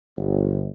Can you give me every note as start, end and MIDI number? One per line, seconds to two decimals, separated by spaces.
0.18 0.68 31